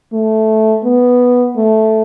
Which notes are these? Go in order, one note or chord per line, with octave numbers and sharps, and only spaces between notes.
A3
B3
A3